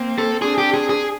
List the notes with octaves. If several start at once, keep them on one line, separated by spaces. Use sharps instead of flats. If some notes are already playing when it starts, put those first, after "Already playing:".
Already playing: A#3 C4
A4
C4 D4 G#4
G4
G#4
G#4